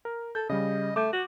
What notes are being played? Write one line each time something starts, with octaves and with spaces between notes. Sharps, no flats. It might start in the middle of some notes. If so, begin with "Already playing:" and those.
A#4
A4 G6
C#3 G3 D#5
A3 D6 G6
F#4